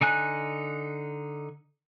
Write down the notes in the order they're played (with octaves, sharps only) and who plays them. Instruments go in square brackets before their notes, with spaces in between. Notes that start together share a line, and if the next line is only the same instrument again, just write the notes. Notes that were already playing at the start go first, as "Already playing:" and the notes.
[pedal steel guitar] D3 D#4 G#5 F#6